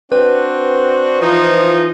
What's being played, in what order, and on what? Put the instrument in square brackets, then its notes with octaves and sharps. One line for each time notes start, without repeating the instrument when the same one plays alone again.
[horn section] C4 D4 F#4 [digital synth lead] B4
[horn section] E3 F3 D#4